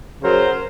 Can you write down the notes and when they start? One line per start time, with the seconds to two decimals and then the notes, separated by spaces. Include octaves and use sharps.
0.22 C#3 F#3 A#4 C5